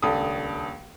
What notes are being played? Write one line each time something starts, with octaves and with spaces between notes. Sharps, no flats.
D#1 C#2 D4 A4 B5 D#6